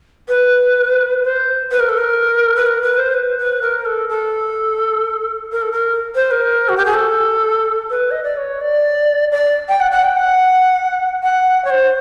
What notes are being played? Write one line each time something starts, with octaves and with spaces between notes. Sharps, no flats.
B4
C5
B4
A#4
A4
A#4
B4
A#4
B4
C5
B4
B4
A#4
A4
A4
A#4
A4
A#4
C5
A#4
F#4
G4
G#4
A4
B4
D#5
D5
C#5
D5
D5
G5
F#5
F#5
G5
F#5
F#5
C#5
C5